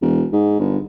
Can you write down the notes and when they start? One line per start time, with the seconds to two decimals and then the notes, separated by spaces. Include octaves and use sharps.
0.02 E1
0.33 G#2
0.60 G1